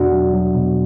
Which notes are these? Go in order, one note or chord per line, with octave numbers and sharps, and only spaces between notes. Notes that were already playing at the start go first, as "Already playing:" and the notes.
Already playing: E2 B2 D4 F#4
F#3
F#3
B2